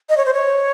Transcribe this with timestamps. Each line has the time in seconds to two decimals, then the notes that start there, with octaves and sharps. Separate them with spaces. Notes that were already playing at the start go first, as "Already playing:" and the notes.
0.10 D#5
0.17 C#5
0.26 C5
0.34 C#5